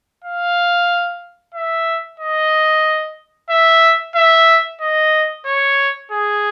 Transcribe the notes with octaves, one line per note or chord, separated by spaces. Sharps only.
F5
E5
D#5
E5
E5
D#5
C#5
G#4